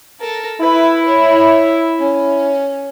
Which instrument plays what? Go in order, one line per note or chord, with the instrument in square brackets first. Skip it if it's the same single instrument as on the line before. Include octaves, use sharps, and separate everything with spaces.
[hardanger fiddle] A4 A#4
[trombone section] E4 [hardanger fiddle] B4
[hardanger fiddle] C#5
C#4